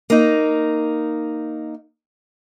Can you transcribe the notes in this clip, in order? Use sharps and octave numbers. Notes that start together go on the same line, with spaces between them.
A#3 D#4